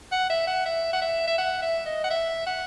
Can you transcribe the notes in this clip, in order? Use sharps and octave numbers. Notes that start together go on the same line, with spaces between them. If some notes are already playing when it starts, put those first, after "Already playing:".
F#5
E5
F#5
E5
F#5
E5
E5
F#5
E5
D#5
F#5
E5
F#5